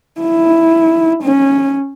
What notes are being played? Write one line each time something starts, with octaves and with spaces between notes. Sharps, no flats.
E4
C#4